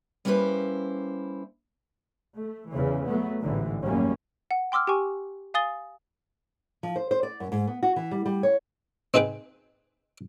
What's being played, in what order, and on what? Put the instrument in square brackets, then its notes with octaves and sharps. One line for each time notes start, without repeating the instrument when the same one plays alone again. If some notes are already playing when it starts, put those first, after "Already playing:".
[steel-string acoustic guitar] G3 A#3 C#4 E4 B4 C5
[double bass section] A3
E2 C#3 E3
F#3 A3 B3
A1 G#2 D3 E3
G#1 F#2 F#3 G3 A#3 C#4
[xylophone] F#5
G5 C6 D6 E6 F6
G4 G5 G#5 C#6
F5 G#5 D#6 A6 G7
[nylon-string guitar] F3
C5
C5
D5
F#2
G#2
B3
F#4
E3
G3
G3
C#5
[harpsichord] C4 D#4 G#4 B4 G5